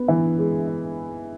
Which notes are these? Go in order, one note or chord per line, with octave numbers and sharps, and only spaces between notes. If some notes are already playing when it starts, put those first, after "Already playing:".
Already playing: B3
E3
G#3
E4